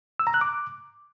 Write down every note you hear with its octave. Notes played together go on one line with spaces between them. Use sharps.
E6
A#5
F#6
D6